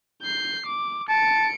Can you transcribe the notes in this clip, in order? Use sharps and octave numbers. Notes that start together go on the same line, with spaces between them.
G6 C7
D6
A5 C#7 D7